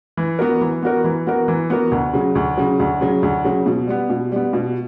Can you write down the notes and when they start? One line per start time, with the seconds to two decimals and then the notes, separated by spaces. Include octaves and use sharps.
0.17 E3
0.39 B3 F#4 A#4
0.61 E3
0.82 B3 F#4 A#4
1.04 E3
1.27 B3 F#4 A#4
1.48 E3
1.70 B3 F#4 A#4
1.91 D2
2.13 C#3 F#3
2.35 D2
2.58 C#3 F#3
2.80 D2
3.01 C#3 F#3
3.23 D2
3.44 C#3 F#3
3.66 B2
3.87 G3 B3
4.10 B2
4.32 G3 B3
4.53 B2